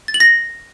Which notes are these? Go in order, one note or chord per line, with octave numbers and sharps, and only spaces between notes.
A6
F#7
A#6